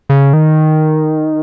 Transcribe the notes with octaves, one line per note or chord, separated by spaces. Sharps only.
C#3
D#3